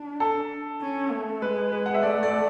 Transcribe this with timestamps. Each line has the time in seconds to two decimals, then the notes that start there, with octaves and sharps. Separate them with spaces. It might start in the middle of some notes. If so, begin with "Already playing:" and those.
Already playing: D4
0.20 A4
0.81 C#4
1.11 A3
1.42 G#3 B4
1.72 B4
1.86 F#5
1.94 E5
2.02 A3 D5
2.23 D5